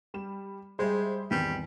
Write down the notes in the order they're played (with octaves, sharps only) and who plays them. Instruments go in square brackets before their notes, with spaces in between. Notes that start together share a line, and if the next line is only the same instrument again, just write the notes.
[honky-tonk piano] G3 E7
[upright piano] G3 G#4 [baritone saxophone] G#3 [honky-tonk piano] C5 E5
[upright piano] G#1 E2 [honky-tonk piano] D#3 [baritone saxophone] G3